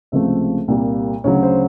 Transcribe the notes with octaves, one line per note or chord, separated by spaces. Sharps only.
C#2 C3 F3 A3 E5
C2 A#2 G3 A#3
D2 C#3 F#3 C#5
C5